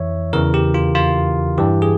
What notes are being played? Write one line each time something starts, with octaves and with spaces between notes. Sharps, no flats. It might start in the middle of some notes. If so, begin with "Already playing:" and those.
Already playing: F2 E3 C#5 E5
E2 C#3 E3 A#4
G4
F4
F4
G2 E3 G4
G#4